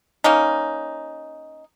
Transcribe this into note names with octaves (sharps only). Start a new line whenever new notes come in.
A#3 C#4 D#4